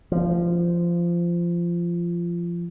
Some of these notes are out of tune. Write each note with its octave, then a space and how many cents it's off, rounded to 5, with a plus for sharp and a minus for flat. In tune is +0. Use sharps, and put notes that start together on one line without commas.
F3 -20